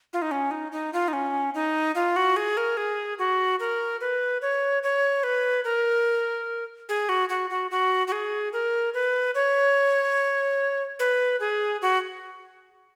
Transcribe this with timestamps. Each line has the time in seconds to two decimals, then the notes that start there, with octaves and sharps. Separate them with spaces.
0.13 F4
0.22 D#4
0.31 C#4
0.51 D#4
0.72 D#4
0.93 F4
1.08 D#4
1.13 C#4
1.54 D#4
1.95 F4
2.16 F#4
2.36 G#4
2.57 A#4
2.77 G#4
3.19 F#4
3.60 A#4
4.00 B4
4.42 C#5
4.83 C#5
5.23 B4
5.64 A#4
6.89 G#4
7.09 F#4
7.29 F#4
7.50 F#4
7.71 F#4
8.07 F#4
8.12 G#4
8.53 A#4
8.94 B4
9.35 C#5
10.99 B4
11.40 G#4
11.82 F#4